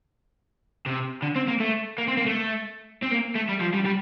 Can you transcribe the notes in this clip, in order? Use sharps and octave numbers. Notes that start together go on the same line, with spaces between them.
C3
D3
C4
A#3
A3
A#3
C4
A#3
A3
C4
A#3
A3
G3
F3
G3
G3